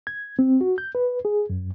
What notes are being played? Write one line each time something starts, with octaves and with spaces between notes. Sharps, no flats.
G#6
C4
F#4
G6
B4
G#4
F#2